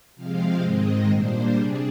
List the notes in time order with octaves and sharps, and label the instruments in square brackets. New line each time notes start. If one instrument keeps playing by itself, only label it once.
[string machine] C3 F3 G#3 C4 F5
G#2 D#3 G#3 C4 D#5
A#2 G3 A#3 D4 C5
C3 G3 D4 G#4